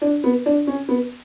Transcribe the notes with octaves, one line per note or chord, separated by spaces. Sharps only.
D4
B3
D4
C#4
B3